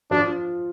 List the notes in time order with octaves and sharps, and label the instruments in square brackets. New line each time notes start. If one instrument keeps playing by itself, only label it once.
[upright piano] F3 F4 [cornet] D4